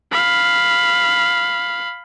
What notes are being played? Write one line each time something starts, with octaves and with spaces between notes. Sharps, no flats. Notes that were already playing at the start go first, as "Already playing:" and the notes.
F5 B5